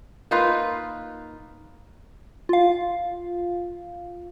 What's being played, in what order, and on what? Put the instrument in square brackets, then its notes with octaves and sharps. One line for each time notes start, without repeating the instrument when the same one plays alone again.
[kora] A#3 D#4 F4 B4
[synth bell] F4 F5